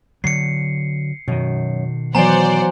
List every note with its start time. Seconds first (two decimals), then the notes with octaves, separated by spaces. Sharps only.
0.24 D3 F#3 C7 C#7
1.28 F#2 B2 D#3
2.15 E3 F#3 B3 C5 D5 F#5 G#5 A#5